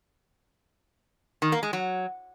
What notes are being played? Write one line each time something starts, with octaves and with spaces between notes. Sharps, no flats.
D#3
A#3
G#3
F#3